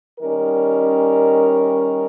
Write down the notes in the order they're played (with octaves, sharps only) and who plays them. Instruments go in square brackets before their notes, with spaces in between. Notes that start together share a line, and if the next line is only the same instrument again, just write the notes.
[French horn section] D#3 G3 C#4 A#4